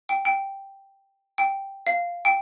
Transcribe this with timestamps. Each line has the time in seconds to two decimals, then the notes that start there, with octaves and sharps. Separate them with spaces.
0.09 G5
0.25 G5
1.38 G5
1.87 F5
2.25 G5